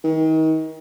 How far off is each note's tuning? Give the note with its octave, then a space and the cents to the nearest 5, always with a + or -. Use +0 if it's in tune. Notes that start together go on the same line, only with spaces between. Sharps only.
D#3 +35